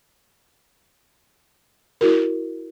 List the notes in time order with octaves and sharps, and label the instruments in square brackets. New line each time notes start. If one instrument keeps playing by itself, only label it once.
[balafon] E4 F#4 A#4